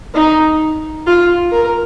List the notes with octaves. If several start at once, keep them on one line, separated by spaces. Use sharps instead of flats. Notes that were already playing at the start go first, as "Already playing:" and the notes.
D#4
F4
A#4